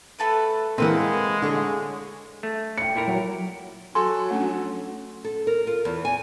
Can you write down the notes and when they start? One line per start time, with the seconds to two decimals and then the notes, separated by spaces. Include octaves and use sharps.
0.19 A3 A4 B4
0.78 E3 G#3 A#3 C4 B4 F5 F#5
1.42 D3 C#5 C#6
2.43 A3
2.78 G5 C#7
2.95 A#2 E4 A#4
3.07 F#3
3.95 F#3 F#4 A4 G#5 C6
4.31 A3 C#4 D4
5.24 A4
5.47 A#4
5.67 F4
5.85 E2
6.05 G#5